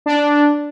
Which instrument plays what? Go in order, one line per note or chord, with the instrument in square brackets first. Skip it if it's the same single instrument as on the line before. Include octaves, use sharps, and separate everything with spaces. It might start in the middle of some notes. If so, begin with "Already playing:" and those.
[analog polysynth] D4